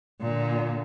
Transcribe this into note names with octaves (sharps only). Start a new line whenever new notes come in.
A#2 D3